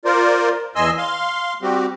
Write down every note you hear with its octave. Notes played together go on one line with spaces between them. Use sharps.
F4 A#4 C5 D5
E2 D#5 G#5 C6 E6
F5 C6
G3 C4 F#4 G4